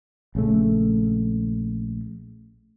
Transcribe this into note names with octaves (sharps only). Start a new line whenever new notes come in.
A#1 C#3 A3